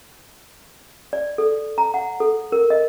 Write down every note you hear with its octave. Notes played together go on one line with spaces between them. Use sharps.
D5
A4
A#5
F#5
A4
A#4
D#5